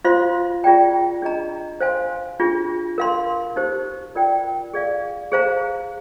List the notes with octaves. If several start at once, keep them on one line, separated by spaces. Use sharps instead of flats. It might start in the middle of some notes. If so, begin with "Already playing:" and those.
F4 C5 F5 C6
F4 G#4 D5 G5 A#5
D4 G#4 D#5 A#5
C5 F5 G#5 C6
D4 F4 G#4
A#4 F5 C6
D#4 G4 C5
F4 A#4 D5 G5
G#4 D5 F5
G#4 C5 F5 A#5